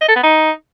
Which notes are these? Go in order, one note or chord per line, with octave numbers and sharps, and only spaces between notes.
D#5
A4
B3
D#4